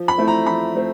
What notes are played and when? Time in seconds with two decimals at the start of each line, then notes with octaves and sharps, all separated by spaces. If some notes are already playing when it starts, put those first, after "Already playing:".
Already playing: F3
0.08 B5
0.18 A3 C4 E4
0.28 A#5
0.46 F3 B5
0.75 A3 C4